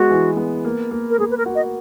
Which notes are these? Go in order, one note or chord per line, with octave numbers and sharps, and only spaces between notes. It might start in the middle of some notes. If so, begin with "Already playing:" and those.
Already playing: G#3 B3 F#4
E3
B3
A#3
A#3
A#4
A#3 G#4
B4
A#4
F#4
D#5